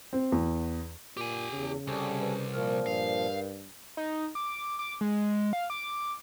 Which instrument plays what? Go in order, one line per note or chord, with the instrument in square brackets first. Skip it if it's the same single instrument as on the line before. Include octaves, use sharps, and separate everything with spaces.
[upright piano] C4
E2
[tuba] A#2 [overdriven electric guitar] G4 G#5
[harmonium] E2 [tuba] C#3
[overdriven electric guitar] C2 [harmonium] G3 A4 G#5
[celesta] B4
[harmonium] A#2 F3 [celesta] A#4 F6
[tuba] G2 [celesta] A#4 [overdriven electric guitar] F5
[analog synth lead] D#4
D6
D6
G#3
F5
D6